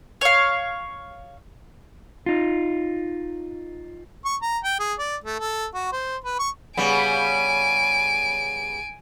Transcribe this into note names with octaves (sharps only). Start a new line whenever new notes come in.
C#5 F5
D#4 F4
C#6
A#5
G5
G#4
D5
A3
A4
F#4
C5
B4
C#6
C#3 G3 B3 G#5 D7